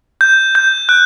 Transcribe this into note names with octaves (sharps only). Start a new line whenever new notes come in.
G6
G6
F#6